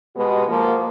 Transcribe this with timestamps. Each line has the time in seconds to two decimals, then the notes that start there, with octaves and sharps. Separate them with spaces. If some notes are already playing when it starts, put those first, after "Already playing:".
0.16 B2 G#3 B3 G4
0.47 F3 A#3